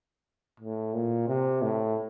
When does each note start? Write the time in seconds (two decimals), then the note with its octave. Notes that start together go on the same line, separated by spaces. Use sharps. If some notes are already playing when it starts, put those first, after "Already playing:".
0.60 A2
0.94 A#2
1.28 C3
1.62 A2